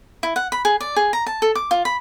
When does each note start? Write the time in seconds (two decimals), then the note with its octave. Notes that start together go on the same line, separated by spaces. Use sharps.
0.23 E4
0.36 F#5
0.52 B5
0.65 G#4
0.80 D5
0.96 G#4
1.13 A#5
1.26 A5
1.42 A4
1.55 D6
1.71 F4
1.85 B5